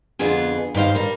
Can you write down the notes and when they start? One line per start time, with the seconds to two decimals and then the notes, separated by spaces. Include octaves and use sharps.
0.19 F2 D3 B3 F4 G#4
0.75 G2 D#3 C5 F5
0.95 G3 A#4